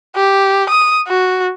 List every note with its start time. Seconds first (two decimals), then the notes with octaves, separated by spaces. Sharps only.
0.16 G4
0.69 D#6
1.08 F#4